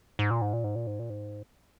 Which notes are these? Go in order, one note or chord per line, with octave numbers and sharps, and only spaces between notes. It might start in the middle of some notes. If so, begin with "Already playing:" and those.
G#2
A#2
G#2
A#2
G#2
A#2
G#2
A#2
G#2